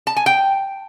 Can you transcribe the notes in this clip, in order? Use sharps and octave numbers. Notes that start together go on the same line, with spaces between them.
A5
G#5
G5